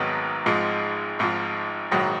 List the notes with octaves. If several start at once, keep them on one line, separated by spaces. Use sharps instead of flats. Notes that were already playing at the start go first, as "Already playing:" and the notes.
Already playing: G#1 G#2 D#3 F#3 B3
G#1 G#2 F3 G#3
G#1 G#2 F3
A#1 G#2 D#3 F#3